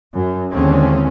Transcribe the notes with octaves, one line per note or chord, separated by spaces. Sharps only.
F#2
D#2 D3 E3 G#3 C4 C#4